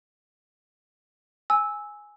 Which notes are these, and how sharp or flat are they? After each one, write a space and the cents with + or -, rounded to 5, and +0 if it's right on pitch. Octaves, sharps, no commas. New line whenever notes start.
G#5 +0 E6 -10